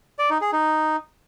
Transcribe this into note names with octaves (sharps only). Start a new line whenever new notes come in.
D5
D#4
G#4
D#4